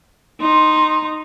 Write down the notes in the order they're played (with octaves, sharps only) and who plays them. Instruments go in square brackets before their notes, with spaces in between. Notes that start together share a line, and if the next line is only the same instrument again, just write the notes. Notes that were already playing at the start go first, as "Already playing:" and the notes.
[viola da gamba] D#4 [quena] C6